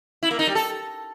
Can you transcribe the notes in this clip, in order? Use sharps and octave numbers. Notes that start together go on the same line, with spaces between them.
E4
A#3
D#4
G3
A4